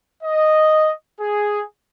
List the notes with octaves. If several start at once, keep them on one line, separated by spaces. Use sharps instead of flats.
D#5
G#4